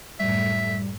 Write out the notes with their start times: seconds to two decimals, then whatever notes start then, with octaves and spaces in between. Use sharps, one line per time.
0.20 F#2 A2 G3 A3 E5